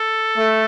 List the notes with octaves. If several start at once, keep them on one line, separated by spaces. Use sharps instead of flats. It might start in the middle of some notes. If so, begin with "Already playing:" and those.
Already playing: A4
A3